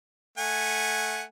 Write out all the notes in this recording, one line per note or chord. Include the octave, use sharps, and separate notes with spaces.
A3 F#5 G#5